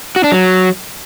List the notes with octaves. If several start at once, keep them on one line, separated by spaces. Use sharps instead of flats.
F#4
D4
F#3